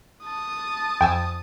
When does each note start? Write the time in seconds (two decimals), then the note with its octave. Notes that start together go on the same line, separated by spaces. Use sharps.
0.25 A5 D#6
1.01 F2 G5 G#5 E6